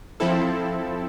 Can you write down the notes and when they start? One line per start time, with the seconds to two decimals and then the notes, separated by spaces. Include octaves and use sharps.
0.20 F3 C4 E4 A4